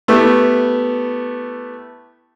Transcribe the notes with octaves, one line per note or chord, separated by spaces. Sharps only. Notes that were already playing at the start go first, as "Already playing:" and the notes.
A3 B3 E4 G4